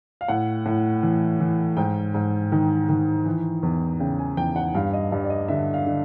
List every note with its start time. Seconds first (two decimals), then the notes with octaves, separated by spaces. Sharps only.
0.21 F5
0.28 A2 F#5
0.66 A2
1.03 E3
1.40 E3
1.77 G#2 G5
2.14 G#2
2.52 D#3
2.89 D#3
3.25 E3
3.63 E2
4.00 C#3 G5
4.19 G#5
4.37 E2 G5
4.56 F#5
4.75 G2 F5
4.93 D#5
5.12 G2 D5
5.24 D5
5.30 D#5
5.48 D3 E5
5.74 F5
5.86 D3